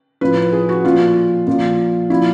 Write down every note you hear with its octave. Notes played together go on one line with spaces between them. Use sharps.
A2 F3 B4
G#4
F#4
A#2 F3 F4
A#2 F3
A#2 F3 E4